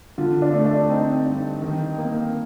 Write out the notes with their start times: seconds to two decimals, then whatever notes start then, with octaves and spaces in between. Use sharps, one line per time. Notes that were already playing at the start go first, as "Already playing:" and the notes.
0.18 D3 F4
0.42 D4
0.54 A3
0.65 D4
0.90 C4 D#4
1.26 G2
1.62 D#3
1.98 A#3